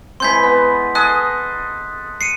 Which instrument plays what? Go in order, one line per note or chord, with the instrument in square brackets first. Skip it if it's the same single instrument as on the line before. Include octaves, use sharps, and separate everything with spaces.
[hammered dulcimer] E3 G#3 C4 [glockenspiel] C6 G6 B6
[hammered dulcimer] B3
[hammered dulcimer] G#4 A4 D#5 [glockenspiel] D#6 F#6
[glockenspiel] C7 C#7 D#7